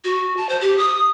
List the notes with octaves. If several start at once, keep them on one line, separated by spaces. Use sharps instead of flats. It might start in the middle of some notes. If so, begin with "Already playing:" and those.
F#4
A5
C5
G4
D#6